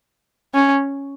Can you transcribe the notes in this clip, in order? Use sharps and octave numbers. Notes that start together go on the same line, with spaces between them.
C#4